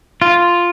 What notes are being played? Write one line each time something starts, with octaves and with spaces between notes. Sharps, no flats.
F4